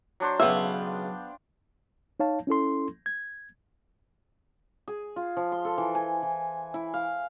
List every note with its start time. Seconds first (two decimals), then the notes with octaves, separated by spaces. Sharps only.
0.20 F#3 D4 C5
0.39 B1 C#3 B3 E5 F5 G5 G#5
2.20 D#4 C#5 F5 A5
2.47 C#4 E4 A4 C6
3.06 G#6
4.88 G#4
5.16 F4
5.37 F3
5.52 C6
5.65 A4
5.78 E3
5.95 G#5
6.23 E3
6.74 E4
6.94 F5